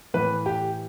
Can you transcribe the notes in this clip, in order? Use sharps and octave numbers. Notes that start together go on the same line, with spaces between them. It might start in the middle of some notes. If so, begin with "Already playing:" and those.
A2 E3 B4
G4